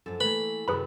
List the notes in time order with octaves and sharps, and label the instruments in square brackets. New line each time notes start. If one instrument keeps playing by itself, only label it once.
[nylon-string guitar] F#2 F3 [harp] A4
[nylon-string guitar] E3 A3 A#3 [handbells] B4 [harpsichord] B5
[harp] F#2 C3 [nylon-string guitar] D#3 [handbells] G#4 B4 B5